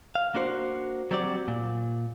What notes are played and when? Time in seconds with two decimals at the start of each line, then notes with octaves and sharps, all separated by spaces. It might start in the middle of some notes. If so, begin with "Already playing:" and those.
0.15 F5
0.35 A#3 D4 F#4 C5
1.11 F#3 G3 C4 F#4 D5
1.48 A#2